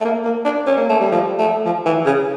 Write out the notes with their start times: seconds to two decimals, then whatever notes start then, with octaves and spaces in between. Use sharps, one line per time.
0.01 A3
0.05 A#3
0.25 A#3
0.45 D4
0.66 C#4
0.77 A#3
0.89 A3
1.00 G3
1.12 F3
1.39 A3
1.65 F3
1.86 E3
2.06 C#3